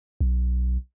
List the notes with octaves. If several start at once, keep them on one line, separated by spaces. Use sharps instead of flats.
B1